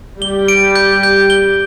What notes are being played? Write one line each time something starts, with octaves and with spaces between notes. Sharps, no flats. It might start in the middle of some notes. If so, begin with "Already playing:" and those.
G3 G4 G7
D7
G6
G6
G7